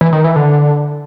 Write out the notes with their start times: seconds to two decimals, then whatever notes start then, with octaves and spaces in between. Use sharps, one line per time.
0.01 E3
0.13 D#3
0.24 E3
0.36 D3